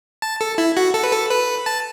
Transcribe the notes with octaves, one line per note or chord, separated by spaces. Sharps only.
A5
A4
E4
F#4
A4
B4
A4
B4
A5